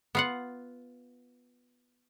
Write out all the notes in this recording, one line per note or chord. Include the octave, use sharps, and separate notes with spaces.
B3 F4 F#5